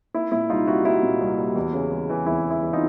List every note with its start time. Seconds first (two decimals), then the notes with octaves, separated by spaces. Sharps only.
0.14 A#3 E4
0.32 A#2 E4
0.49 C2 D#4 F4
0.67 G3 E4 F#4
0.85 A#3 E4 F#4
1.03 A#2
1.20 C2
1.38 G3
1.55 E2
1.73 C#3
1.91 E2
2.10 E3
2.26 E2 E4
2.44 C#3
2.51 E4
2.63 E2
2.73 D#4 F4